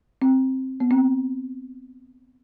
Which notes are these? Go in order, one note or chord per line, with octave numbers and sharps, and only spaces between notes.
C4
B3
C4